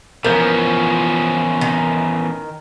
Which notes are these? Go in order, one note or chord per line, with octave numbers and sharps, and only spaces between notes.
E3 F3 B3 C#4 A#4 G6
D#3